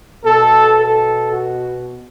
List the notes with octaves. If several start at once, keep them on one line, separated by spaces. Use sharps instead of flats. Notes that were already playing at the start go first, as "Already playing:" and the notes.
B2 A4
A4
F#4